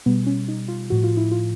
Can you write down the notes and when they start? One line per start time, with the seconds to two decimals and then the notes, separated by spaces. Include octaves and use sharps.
0.06 B2 G3 B3
0.27 C#4
0.48 D#4
0.68 F4
0.90 A2 F3 F#4
1.04 F4
1.17 E4
1.32 F4